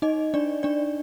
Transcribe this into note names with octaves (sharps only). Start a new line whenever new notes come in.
D#4 D#5
D4 D5
D4 D5